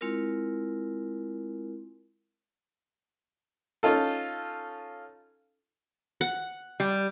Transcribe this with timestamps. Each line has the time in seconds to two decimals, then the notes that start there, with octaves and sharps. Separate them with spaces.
0.01 G#3 C4 E4 F4 A#4
3.83 C#4 D#4 F4 A4
6.21 F#5
6.80 G3